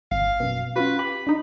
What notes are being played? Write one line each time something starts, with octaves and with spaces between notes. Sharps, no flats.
G#1 F5
F#2 B2
C#4 F4 F#4 B4
G4 B5
D4 D#4